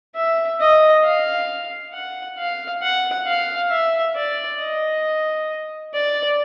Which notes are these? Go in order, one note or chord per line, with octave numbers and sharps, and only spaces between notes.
E5
D#5
F5
F#5
F5
F#5
F5
E5
D5
D#5
D5